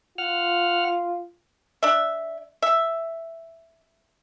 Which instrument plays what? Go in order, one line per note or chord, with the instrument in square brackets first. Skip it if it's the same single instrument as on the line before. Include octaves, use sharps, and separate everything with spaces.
[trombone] F4 [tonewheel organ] F#5 F6
[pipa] D4 E5
E5